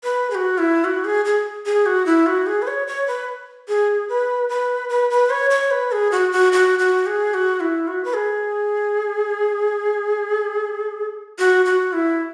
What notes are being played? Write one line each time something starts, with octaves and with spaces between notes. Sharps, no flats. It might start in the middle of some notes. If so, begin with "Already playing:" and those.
B4
G#4
F#4
E4
F#4
G#4
G#4
G#4
F#4
E4
F#4
G#4
B4
C#5
C#5
B4
G#4
B4
B4
B4
B4
C#5
C#5
B4
G#4
F#4
F#4
F#4
F#4
G#4
F#4
E4
F#4
B4
G#4
F#4
F#4
E4